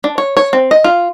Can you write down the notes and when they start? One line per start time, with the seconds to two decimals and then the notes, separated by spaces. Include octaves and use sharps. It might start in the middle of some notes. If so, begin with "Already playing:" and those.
0.04 D4
0.18 C#5
0.37 C#5
0.53 C4
0.71 D#5
0.84 F4